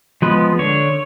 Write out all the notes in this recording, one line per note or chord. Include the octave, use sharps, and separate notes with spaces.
F3 G#3 B3 B4
D3 C#5